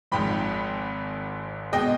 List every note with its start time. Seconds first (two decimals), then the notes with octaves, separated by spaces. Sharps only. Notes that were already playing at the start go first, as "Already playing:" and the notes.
0.12 G#1 G#2 F3 G5 B5
1.72 B2 G#3 D#5 G5